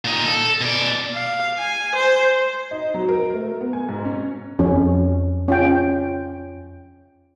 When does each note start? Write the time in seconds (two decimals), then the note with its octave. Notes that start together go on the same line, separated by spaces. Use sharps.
0.05 A#2 D#4
0.25 A4
0.61 B2 D5
1.15 F5
1.58 G#5
1.95 C5
2.71 D#4
2.94 F#3
3.09 A#4
3.34 A3
3.61 B3
3.73 G#5
3.89 G#2
4.05 C#4
4.59 F2 C#4
5.48 C#4 F4 G5